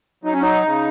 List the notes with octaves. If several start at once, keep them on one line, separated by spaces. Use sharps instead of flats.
F#3 D#4
C#4
D#4
C#3